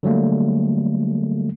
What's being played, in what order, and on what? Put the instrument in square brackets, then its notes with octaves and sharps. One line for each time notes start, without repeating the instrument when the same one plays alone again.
[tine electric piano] D3 F#3 G3 A3 A#3